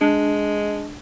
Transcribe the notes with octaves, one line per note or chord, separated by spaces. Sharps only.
G#3 D4